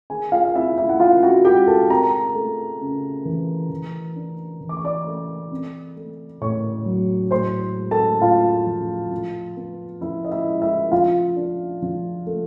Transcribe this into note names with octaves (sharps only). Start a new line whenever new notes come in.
D#3 G#4 G#5
F4 F5
F5
C4 E4 E5
E4 E5
F#5
D#3 F4 F5
F#4 F#5
G#3 G4 G5
A4 A5
C4 A#4 A#5
A3
C#3
E3
E3
D4
E3
D6
C#6
D5 D6
A3
C4
A3
A2 C#5 C#6
F#3
A2 C5 C6
G#3
A4 A5
A2 F4 F5
F3
F3
B3
F3 E4 E5
D#5
E4 E5
G#3
E4 E5
F3 F4 F5
D4
F3
A3